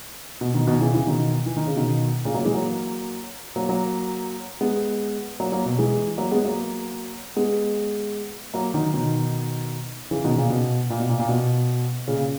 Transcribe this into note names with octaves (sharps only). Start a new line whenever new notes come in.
B2
B2 D#3
B2 D#3
C#3 E3
C#3 E3
B2 D#3
E3
D#3
C#3
B2 D#3
A#2 C#3
F#3 A#3
E3 G#3
F#3 A#3
F#3 A#3
F#3 A#3
G#3 B3
F#3 A#3
F#3 A#3
B2
E3 G#3
F#3 A#3
G#3 B3
F#3 A#3
G#3 B3
F#3 A#3
D#3 F#3
B2 D#3
C#3 E3
B2 D#3
A#2 C#3
B2
A#2
B2
A#2
A#2
B2
A#2 C#3